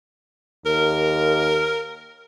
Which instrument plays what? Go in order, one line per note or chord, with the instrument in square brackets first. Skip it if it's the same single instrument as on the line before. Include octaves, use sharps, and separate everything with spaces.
[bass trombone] D#2 [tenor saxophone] A#4